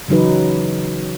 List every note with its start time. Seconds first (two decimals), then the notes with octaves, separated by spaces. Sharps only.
0.08 C#3 E3 F#3 D#4 B4